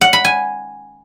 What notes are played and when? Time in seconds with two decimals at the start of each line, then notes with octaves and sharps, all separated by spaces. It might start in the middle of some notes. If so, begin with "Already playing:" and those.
0.01 F#5
0.13 B5
0.25 G#5